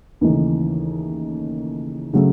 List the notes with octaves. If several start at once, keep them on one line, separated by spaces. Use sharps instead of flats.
D#2 C#3 E3 A3 D#4
C#3 F#3 A3